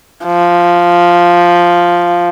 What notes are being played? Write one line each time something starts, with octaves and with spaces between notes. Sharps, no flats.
F3